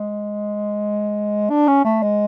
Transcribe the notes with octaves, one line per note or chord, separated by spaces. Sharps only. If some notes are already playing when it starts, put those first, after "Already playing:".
Already playing: G#3
D4
C#4
A3
G#3